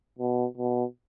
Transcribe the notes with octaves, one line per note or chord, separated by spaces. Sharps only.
B2
B2